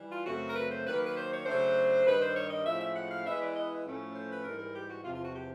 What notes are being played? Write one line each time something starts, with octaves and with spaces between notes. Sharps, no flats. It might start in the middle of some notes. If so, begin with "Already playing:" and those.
Already playing: E3 G3
F4
F#2 C#3 F#3 A3 C4 F#4
A#4
B4
C5
D#3 F#3 A#3 B4
A#4
B4
C5
C#5
C#3 F#3 A3 D4 C5
G2 D#3 G3 B4
C5
C#5
D#5
A2 F3 G#3 C#4 E4 E5
E5
F#5
F5
E3 G#3 B3 E4 E5
D5
D#5
A2 F3 A3 C#4
C5
B4
G#2 E3 G3 A#4
A#4
G4
F#4
E2 C3 F3 F4
F4
F#4
G4